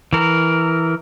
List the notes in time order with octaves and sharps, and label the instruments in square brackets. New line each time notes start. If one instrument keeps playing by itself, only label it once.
[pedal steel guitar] E3 A#4